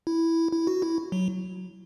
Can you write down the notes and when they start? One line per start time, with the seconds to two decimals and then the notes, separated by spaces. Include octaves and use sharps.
0.07 E4
0.53 E4
0.67 F#4
0.82 E4
1.12 F#3